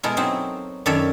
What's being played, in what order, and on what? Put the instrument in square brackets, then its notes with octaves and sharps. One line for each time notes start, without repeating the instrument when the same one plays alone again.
[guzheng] B2 G#3 E4 A4 A#4
F#3 C4 D#4
F#2 D#3 A4 C#5 D5 E5